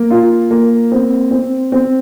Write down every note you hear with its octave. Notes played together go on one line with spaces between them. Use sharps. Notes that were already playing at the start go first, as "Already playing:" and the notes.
Already playing: A#3
F4
A#3
C4
C4
C4